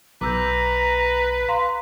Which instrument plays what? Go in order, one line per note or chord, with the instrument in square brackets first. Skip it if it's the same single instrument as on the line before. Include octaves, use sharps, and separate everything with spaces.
[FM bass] B1 [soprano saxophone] B4 [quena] A#5 [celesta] D6 E6 G6
[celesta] F5 A#5 C6